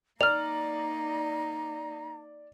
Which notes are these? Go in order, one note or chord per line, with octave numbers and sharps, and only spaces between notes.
A#3 D#4 D5 A#5 F6 F7